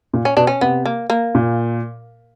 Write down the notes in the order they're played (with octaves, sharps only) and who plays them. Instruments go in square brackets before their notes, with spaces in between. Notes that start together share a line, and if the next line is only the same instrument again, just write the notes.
[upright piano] A#2
[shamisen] C#4
[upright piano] B2 [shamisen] D4
[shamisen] C#4
[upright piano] C3 [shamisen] B3
[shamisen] A#3
A#3
[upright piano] A#2